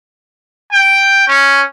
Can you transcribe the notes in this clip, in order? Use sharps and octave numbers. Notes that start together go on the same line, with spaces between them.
G5
C#4